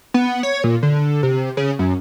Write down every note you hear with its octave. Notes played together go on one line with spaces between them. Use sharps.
B3
C#5
A#2
D3
C3
C#3
F#2